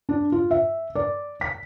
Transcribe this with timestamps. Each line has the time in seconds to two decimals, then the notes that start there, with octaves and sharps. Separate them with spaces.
0.09 D4
0.32 F4
0.51 E5
0.95 D5
1.41 B6